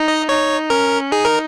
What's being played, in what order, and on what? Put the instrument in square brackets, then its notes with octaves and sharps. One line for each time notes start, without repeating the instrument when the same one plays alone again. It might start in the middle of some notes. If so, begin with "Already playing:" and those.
Already playing: [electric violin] D#4
[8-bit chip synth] D#5
[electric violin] D#4 [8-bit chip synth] C#5
[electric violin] C#4 [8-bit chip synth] A#4
[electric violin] D#4 [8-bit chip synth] G#4
[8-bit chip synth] A#4